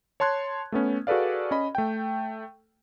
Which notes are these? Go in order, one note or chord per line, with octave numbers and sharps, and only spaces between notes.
C#5 A5 C6 F#6 G#6
A3 B3 C#4
F#4 G#4 A4 B4 D5 F5
C#4 D#5 B5
A3 G5